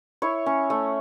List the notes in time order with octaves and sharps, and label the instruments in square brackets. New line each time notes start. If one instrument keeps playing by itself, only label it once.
[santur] E4 C#5
C#4
A3